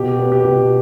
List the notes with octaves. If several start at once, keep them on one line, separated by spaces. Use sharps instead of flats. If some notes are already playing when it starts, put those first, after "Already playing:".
Already playing: B2 G4
B3
G4
B2